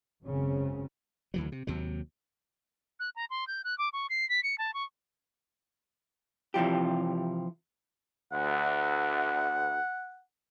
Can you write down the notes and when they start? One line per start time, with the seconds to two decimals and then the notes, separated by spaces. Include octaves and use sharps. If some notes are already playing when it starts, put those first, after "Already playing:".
0.25 G#1 F#2 C#3 C4 C#4
1.34 D2 E3 F#3
1.52 C3
1.67 D#2 C3 F#3
3.00 F#6
3.16 A#5
3.30 C6
3.47 G6
3.64 F#6
3.78 D6
3.93 C#6
4.10 C7
4.29 B6
4.43 C#7
4.58 A5
4.74 C#6
6.54 C3 E3 F3 G4
8.32 D2 F#5